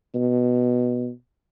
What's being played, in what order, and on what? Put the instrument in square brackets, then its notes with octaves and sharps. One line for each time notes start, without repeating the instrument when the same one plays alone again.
[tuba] B2